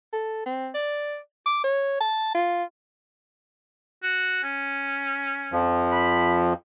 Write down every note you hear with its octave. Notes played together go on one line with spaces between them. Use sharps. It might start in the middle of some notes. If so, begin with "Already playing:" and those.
A4
C4
D5
D6
C#5
A5
F4
F#4
C#4
F2 F3
B5